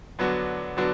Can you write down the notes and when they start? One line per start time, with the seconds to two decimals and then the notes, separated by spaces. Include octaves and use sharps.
0.19 D3 F#3 B3 D4 F#4
0.77 D3 F#3 B3 D4 F#4